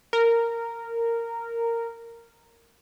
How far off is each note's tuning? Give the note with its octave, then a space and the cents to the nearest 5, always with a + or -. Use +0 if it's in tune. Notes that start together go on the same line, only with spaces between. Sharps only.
A#4 -10